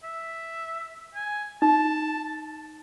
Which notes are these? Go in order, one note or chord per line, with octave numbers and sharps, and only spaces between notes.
E5
G#5
D#4 A5